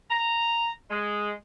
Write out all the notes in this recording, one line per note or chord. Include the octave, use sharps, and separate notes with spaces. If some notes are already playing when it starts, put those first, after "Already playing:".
A#5
G#3